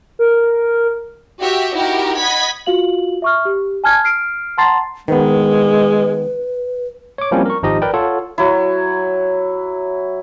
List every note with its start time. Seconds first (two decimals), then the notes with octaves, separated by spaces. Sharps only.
0.19 A#4
1.40 F#4 G4 E5
1.74 D#4 E4 F#4 G4 A#4
2.18 D#5 F#5 B5 G#6 B6
2.66 F4 F#4 F5 F#7
3.22 E5 C#6 F6
3.45 G4
3.84 G#5 A5 F6 G#6
4.04 F6 C7 D7
4.58 F#5 A5 A#5 C6 A6 C7
5.08 D#3 G#3 B3 B4
7.18 C#5 D6
7.31 F3 G3 A#3 C4 C#4 E4
7.46 A#4 C#6
7.63 G#1 F3 D#4 G4 D#5
7.82 A#4 B4 D5 G5
7.94 F4 A4 C#5 F#5
8.38 F#3 E4